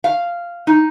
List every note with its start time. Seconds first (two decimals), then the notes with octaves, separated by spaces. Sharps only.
0.04 F5
0.67 D#4